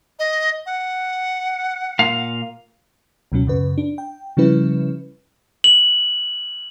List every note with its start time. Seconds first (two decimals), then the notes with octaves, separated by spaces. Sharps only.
0.19 D#5
0.66 F#5
1.99 A#2 F5
3.32 C#2 B2 F#3 C#4
3.47 F#2 C#3 B4
3.78 D4
3.98 G5
4.37 C#3 F3 G3 C#4 E4 B4
5.64 F#7